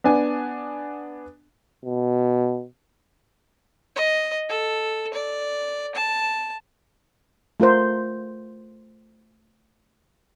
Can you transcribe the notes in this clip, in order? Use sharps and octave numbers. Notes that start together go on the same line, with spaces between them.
B3 D4 G#5
B2
D#5
A4
D5
A5
A3 F4 A#4 C5